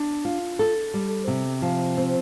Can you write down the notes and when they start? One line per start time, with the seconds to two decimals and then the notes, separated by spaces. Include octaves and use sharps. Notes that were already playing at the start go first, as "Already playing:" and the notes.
Already playing: D4
0.25 F4
0.59 A4
0.94 G3
1.28 C3
1.62 F3
1.97 C4